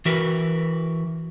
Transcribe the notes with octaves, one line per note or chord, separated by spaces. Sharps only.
E3 F#4 A#4 B4